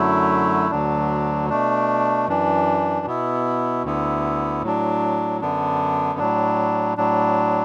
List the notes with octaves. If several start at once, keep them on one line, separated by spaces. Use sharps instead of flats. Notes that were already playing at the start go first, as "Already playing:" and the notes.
Already playing: F#2 D3 F#3 A3 E4
D2 D3 F#3 D4
B2 A3 D4
F#2 E3 D4
B2 B3 E4
D2 D3 B3 E4
A2 F#3 D4
F#2 D3 B3 D4
A2 F#3 D4
A2 F#3 D4